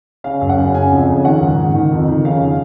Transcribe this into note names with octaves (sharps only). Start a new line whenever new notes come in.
C#3 F5
F#2
F#5
C#3
C#3 G#5
F2
C#3
D#3 F#5
G#2
D#3
D#3
F2
D#3
C#3 F5